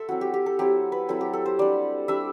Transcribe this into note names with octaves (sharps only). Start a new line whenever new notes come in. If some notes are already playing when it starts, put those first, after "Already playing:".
Already playing: A4 E5 C6
F#3 C4 E4 F#4
G4
G4
A4
F#3 C4 E4 G4
B4
F#3 C4 E4 A4
G4
A4
C5
G3 D4 D5
G3 D4 E5